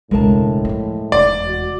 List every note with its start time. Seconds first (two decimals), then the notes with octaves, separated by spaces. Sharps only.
0.11 E1 C#2 A2 G#3 A#4 A5
0.65 F3 A#3
1.12 F1 E2 D5
1.48 F#4